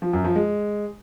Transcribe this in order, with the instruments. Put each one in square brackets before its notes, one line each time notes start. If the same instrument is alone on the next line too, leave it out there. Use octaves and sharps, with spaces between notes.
[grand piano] F3
F#2
F3
G#3